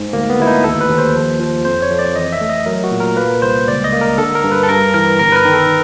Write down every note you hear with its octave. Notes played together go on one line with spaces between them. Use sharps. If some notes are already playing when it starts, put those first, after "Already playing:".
Already playing: G#2
D2 A#3
B3
D2 E4
D#4
D#2 A4
B4
D#2
C5
F3
F3
F2 C5
C#5
F2
D5
E3 D#5
E5
A3
D#5
F#3 A#4
F#4
A#2
A#4
A#3 B4
C2 C5
C#2 D5
D#5
A#3
A#4
D3 A4
A#4
G2
B4
A4
G2 A#4
E3 A#4
G1 A#4
B4
A#4
D#3
A4